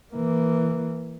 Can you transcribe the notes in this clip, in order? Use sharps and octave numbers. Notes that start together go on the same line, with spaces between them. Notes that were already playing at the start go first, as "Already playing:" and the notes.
E3 A#3